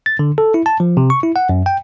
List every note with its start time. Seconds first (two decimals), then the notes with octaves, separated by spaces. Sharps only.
0.06 A6
0.19 D3
0.38 A4
0.54 E4
0.66 A5
0.80 F3
0.97 C3
1.10 C#6
1.23 E4
1.36 F#5
1.49 F#2
1.66 G5